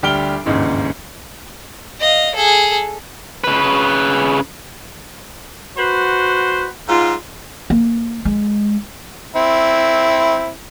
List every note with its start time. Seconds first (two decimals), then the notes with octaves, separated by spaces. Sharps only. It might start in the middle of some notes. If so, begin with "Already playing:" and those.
0.03 D2 G3 G4 F6 D7 G7
0.45 G1 D#2 G#2 C#3 E3
2.01 D#5 F5
2.35 G#4 A4
3.44 C#3 B4
5.76 F#4 B4 C5
6.88 G#2 F4
7.70 A#3
8.25 G#3
9.36 C4 E4